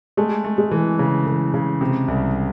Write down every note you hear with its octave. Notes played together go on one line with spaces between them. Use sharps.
G#3 A3
A3
G#3
E3
C#3
E3
C#3
C3
C2